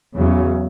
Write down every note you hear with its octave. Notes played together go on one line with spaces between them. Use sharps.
E2 C#3 F#3